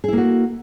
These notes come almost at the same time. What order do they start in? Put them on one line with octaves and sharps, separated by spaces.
G#4 E4 A#3 F#4